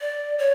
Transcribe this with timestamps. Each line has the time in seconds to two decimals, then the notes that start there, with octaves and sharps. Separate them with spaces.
0.01 D5
0.39 C#5